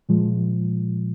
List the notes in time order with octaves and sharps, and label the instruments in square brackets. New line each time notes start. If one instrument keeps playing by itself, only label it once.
[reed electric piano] A#2 F3 G#3